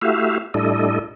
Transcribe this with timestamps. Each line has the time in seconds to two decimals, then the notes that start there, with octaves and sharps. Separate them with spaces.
0.02 A3 E4 F#4 G4 E5 F5
0.54 A2 G3 D4 E4 A4 D#5